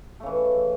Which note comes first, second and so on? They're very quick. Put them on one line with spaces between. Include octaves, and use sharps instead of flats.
A3 C#3 E3